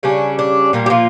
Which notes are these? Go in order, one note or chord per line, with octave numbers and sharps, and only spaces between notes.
C#3 G3 C#4 D4
D4
A#2 G3 A#3
G4
F3 F4